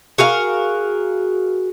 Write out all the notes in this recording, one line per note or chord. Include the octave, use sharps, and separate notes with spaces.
F#4 G#4 A#4 F5